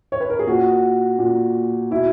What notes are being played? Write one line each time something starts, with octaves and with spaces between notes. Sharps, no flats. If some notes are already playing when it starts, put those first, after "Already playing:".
C#5
B4
A#4
G#4
A#2 F#4
A#2
B2 E4